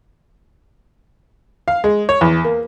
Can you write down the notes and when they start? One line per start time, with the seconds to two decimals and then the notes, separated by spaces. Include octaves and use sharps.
1.68 F5
1.84 G#3
2.09 C#5
2.21 E2
2.44 A#3